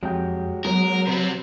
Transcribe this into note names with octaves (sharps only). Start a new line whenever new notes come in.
F2 F#3 G#3 G4 G5
F#3 G#3 B3 A#4 A#5
C3 C4 B4